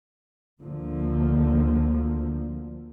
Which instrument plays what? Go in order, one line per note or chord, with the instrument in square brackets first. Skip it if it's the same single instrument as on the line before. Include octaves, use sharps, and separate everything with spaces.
[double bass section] D2 D3 F3 A#3